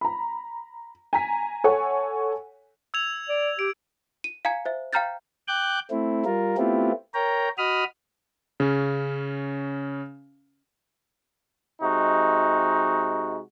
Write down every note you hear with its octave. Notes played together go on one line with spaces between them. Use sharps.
A#5 B5
G#5 A#5 B6
A4 C#5 F#5 G#5 C#6
E6 G#6 F7
D5
G4 D7
D#7
F5 G#5 A#5 G#6 C#7
C5 E5
F5 G5 A#5 F6 G6 A6
G5 D6 F#6 G6
A3 C4 E4
G3 F4 A#4
A3 B3 C4 E4 F4 G4
A#4 C#5 G5 A#5
F#4 D#5 B5 D#6 F6
C#3 C#4
C3 G#3 D#4 F#4